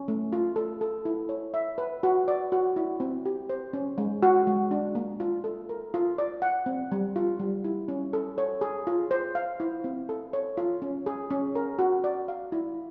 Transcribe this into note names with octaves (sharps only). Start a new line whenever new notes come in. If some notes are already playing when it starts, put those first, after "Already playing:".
Already playing: C#4
A3
F4
A4
A4
E4
C#5
E5
B4
F#4
D5
F#4
E4
C4
G4
C5
C#4
G#3
F#4
G#3
D4
A#3
F4
A4
A#4
F4
D5
F#5
C4
G3
F4
G3
E4
C#4
A4
C#5
G#4
F4
C5
F5
E4
C4
A4
C#5
F4
C#4
G#4
C#4
A#4
F#4
D5
F5
E4